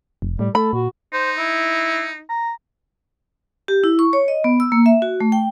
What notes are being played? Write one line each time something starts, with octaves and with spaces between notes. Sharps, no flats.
F1
A2 G3
A3 A4 B5
A#2 F#4
D#4 C5
E4
A#5
G4
E4
C#6
C#5
D#5
B3
E6
A#3
E5
F#4
A3
G5